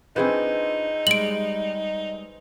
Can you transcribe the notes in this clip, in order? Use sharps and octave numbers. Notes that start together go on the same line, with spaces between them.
F3 C4 D4 D#4 G#4 B4 C5
G3 G#3 D7 F#7